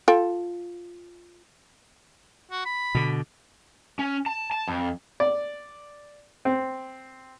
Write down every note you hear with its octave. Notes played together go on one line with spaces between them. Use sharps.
F4 A4 G5
F#4
B5
B2 D3
C#4
A5
A5
F2
D5
C4